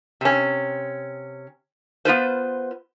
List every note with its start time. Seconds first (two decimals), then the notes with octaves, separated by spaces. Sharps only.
0.21 C3 C#4
2.05 B3 F4 B4 C5